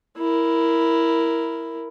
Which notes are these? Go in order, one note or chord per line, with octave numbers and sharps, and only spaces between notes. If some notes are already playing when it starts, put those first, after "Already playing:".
E4 A#4